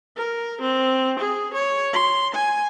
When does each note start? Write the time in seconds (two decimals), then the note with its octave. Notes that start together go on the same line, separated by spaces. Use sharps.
0.17 A#4
0.62 C4
1.19 G#4
1.54 C#5
1.93 C6
2.35 G#5